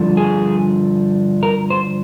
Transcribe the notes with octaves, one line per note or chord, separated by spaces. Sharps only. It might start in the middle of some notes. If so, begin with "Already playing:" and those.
Already playing: G2 D3 F3
G#4
A#4
C5